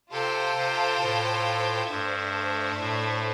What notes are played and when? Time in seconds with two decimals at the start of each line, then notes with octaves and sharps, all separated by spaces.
0.11 C3 F4 A4 C5 G5
0.57 C3
1.01 A2
1.90 G2 A3 D4 A4 C5 E5
2.80 A2